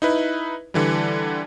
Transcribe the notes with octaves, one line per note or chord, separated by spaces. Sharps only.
D#4 E4 B4
D3 E3 G3